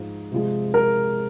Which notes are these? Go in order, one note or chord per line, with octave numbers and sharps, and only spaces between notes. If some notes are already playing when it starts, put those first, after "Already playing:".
Already playing: G#2 F3 G#3
C3 F3 G#3
A#4